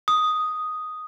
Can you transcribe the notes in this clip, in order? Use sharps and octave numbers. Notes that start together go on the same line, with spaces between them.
D#6